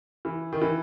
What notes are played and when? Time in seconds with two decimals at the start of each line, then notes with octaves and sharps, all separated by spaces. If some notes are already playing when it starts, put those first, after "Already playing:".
0.25 E3
0.53 D#3
0.62 E3